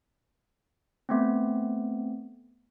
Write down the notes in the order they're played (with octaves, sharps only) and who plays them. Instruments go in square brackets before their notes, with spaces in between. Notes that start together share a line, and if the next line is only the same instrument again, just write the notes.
[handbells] A3 B3 C4